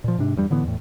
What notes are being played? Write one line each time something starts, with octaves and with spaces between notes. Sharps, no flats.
A#2 F3
G#2 C3 D4
E2 G2 G3
A2 D3 E3 B3
E2 A2